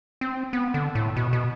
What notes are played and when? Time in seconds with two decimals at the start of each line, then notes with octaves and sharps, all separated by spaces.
0.21 C4
0.53 B3
0.74 D3
0.95 A2
1.16 B2
1.33 B2